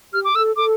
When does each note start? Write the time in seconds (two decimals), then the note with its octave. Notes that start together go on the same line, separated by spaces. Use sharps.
0.13 G4 F6
0.25 D6
0.35 A4 E6
0.56 A4 D6